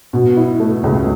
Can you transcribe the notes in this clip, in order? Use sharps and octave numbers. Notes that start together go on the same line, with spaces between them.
B2
E4
A3
C#2